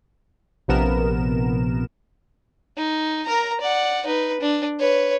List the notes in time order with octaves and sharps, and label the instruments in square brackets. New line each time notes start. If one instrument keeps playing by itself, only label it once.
[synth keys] A#1 C3 F3 B3 A#4 E7
[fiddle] D#4
A#4 A#5
D5 F#5
D#4 B4
D4
B4 C#5